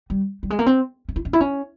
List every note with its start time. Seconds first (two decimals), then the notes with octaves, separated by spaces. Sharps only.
0.10 G3
0.43 G3
0.50 G#3
0.59 A#3
0.66 C4
1.09 C#4
1.16 E4
1.25 C#4
1.33 E4
1.41 C#4